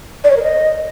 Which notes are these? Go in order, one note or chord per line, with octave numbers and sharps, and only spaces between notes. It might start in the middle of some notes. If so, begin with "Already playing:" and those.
D5
C#5
A#4
D#5